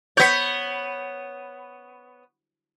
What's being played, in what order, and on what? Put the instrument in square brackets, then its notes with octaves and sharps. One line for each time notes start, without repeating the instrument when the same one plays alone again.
[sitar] B3 C#5 [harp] G6 B6 C#7